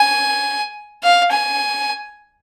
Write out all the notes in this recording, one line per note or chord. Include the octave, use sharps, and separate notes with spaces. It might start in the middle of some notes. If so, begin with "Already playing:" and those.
Already playing: G#5
F5
G#5